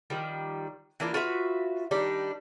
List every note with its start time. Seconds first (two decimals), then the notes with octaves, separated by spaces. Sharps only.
0.10 D#3 F3 G3
1.00 E3 A#3 D4 F4
1.14 F4 F#4 B4 E5
1.91 D#3 G3 D4 D#4